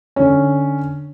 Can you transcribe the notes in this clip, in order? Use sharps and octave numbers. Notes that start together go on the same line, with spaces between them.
D3 C#4